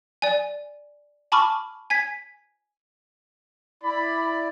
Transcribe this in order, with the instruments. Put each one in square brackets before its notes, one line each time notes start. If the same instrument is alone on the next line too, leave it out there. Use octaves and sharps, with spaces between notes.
[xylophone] D5 G#5
G#5 A5 B5 C#6 D6 F6
G#5 G#6 B6
[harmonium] E4 D5 [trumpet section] B5